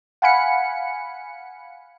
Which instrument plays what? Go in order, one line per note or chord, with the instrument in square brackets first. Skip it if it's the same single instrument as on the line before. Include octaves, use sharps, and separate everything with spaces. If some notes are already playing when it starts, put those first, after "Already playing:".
[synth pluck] F5 F#5 G#5 B5 C#7